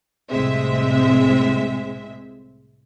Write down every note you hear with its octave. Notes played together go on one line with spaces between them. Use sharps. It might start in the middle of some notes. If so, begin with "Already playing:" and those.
C2 A2 G#3 C4 E5